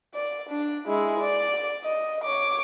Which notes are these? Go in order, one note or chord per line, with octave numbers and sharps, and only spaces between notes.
D5
D4
G#3 E4
D5
D#5
C#5 D6